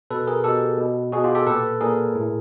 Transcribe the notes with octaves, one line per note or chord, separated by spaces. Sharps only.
B2 A4 B4
G#4 A#4
B2 G4 A4
B2
B2 F#4 G#4
F4 G4
G4 A4
A#2 A4 B4
A#2 G#4 A#4
A2